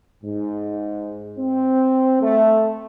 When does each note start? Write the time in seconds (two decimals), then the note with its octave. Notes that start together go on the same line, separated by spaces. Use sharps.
0.24 G#2
1.38 C4
2.22 A3